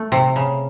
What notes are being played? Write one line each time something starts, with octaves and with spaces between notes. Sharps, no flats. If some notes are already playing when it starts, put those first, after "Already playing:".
Already playing: A3
C3
C#3